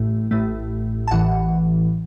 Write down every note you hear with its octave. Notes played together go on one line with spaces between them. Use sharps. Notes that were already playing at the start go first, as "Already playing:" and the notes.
Already playing: A1 A2 A3
A1 A2 A3
A5
A1 A2 E3 F#5